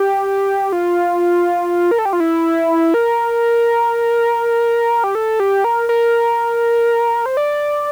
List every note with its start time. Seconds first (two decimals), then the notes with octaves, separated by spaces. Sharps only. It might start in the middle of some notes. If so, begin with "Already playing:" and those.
Already playing: G4
0.72 F4
1.91 A#4
1.99 A4
2.05 G4
2.13 F4
2.20 E4
2.94 A#4
5.04 G4
5.15 A4
5.40 G4
5.64 A#4
5.89 A#4
7.26 C5
7.37 D5